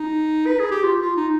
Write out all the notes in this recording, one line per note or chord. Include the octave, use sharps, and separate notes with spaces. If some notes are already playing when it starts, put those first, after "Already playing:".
Already playing: D#4
B4
G#4
G4
F4
F4
D#4